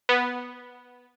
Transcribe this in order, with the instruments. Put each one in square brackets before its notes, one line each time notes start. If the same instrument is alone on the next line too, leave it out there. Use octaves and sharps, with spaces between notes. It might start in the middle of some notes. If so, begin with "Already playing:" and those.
[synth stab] B3